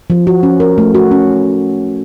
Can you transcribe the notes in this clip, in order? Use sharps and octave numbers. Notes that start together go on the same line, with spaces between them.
F3
F#4
C#4
A#4
A3
F#4
C#4